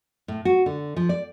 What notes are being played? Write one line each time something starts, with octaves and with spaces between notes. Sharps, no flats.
A2
F#4
D3
F3
D5